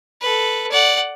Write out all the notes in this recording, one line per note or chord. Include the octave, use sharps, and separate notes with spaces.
A4 B4
D5 F#5